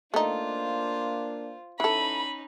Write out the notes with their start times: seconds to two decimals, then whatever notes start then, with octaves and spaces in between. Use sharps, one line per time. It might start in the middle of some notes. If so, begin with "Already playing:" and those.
0.14 A3 A#3 D4 D#4 F4 C5
1.80 E3 C#4 D#4 A4 B5